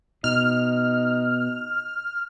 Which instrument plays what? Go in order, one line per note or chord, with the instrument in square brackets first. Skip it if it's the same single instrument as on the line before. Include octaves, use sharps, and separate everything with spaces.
[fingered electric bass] B2 [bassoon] D#4 [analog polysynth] F6